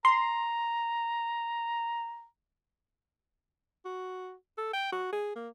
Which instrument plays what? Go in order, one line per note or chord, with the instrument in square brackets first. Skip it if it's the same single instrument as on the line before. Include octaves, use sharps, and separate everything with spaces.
[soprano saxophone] A#5 [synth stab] C6
[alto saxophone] F#4
A4
G5
F#4
G#4
A#3